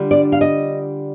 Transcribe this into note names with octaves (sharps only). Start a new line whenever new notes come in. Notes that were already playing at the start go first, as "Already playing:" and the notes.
Already playing: D3 G3 D4 F4
D5
F5
D#5